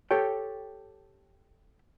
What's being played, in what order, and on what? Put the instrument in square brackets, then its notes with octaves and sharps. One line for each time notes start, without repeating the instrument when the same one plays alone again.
[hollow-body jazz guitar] G4 A4 C#5 G5